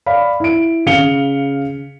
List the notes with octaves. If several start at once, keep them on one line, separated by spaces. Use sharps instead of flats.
D5 F5 B5
E4 D7
C#3 F5 C#7 F7 G7